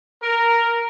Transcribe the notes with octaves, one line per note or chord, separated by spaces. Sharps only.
A#4